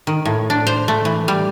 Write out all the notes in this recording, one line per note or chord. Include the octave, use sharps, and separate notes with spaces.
D#3
A2
D4
C5
A3
E3
G3